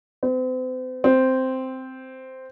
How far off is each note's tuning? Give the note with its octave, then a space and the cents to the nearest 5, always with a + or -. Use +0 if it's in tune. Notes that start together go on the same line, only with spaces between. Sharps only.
C4 -40
C4 -5